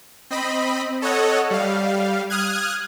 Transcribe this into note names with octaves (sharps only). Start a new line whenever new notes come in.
C4 D#5 B5
A4 C#5 D#5 F#5
G3 F5
D#6 F6 F#6 G#6